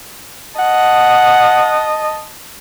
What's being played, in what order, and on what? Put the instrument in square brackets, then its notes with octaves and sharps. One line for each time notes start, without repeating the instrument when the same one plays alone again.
[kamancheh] D#5 A5 [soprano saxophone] F#5